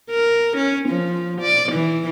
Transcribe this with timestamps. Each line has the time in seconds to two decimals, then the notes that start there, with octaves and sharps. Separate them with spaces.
0.10 A#4
0.57 C#4
0.89 F3
1.41 D5
1.72 E3